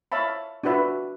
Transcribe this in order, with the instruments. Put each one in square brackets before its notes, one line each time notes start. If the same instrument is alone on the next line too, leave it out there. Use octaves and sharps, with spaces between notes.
[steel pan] C#5 E5 F5 A5 B5
D4 F4 F#4 B4 E5